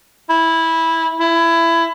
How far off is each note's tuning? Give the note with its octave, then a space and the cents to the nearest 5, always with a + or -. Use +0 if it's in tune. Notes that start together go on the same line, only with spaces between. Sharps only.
E4 -10
E4 +20